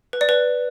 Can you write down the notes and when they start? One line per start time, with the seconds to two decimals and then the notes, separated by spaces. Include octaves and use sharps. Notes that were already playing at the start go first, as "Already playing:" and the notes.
0.13 B4
0.21 D5
0.29 B4